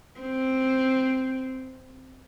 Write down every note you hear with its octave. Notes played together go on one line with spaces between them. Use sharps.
C4